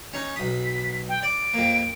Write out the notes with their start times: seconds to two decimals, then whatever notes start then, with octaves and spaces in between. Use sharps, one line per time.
0.14 C#4 D#4
0.36 B1 D#6 B6
1.09 G5
1.23 D5 D7
1.54 F2 A#3